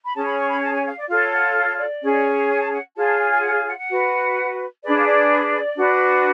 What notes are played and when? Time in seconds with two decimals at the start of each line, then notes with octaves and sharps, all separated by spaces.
0.05 B5
0.15 C#4 G#4 C#5 A5
0.27 B5
0.38 C#6
0.49 B5
0.62 A5
0.73 G#5
0.85 F5
0.97 D5
1.08 F4 A4 C#5 F5
1.32 F#5
1.55 F5
1.78 D5
2.02 C#4 G#4 C#5
2.49 G#5
2.61 A5
2.72 F#5
2.96 F4 G#4 C#5 A5
3.08 A5
3.19 G#5
3.31 G#5
3.43 F#5
3.54 F5
3.67 F#5
3.78 F#5
3.89 F#4 B4
4.83 D4 G#4 B4 D5
4.96 F5
5.07 D5
5.77 D4 F#4 B4